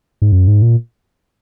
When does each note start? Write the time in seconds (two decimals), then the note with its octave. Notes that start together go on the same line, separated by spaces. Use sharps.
0.22 G#2
0.32 F#2
0.48 G#2
0.62 A#2